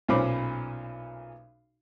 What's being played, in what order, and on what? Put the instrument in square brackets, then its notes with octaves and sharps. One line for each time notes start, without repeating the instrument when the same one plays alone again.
[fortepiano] B1 A#2 C#4 C5 B5 D6